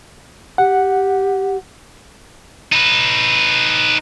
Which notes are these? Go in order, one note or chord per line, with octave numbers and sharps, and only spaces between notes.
G4 F#5
D#4 B4